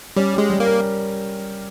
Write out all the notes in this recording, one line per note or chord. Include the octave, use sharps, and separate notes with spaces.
G3 C#4
G#3 G4
G3
A#3
A#4